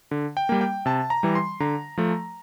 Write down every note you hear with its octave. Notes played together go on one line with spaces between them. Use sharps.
D3
G5
G3 A#3
G5
C3 A5
A#5
E3 G3
C6
D3 A#5
F3 A3